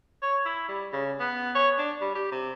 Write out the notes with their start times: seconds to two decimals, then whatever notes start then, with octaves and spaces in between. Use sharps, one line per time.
0.22 C#5
0.45 E4
0.68 G3
0.93 C#3
1.20 B3
1.55 C#5
1.78 D4
2.01 G3
2.15 G4
2.31 C3